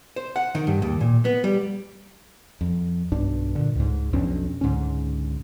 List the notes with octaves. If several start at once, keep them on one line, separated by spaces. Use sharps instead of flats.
C5
F#5
D#3
G2
D#2
A#2
B3
G3
F2
B1 G2 D4
A#2 D3
C#2 G#2
B1 F2 C#4 D4
C#2 G#2 D3 C#4